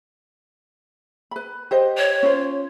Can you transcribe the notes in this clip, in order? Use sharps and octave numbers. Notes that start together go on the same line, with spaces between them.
B4 B5
G4 C5 D#5
C#5
C#4 F4 C5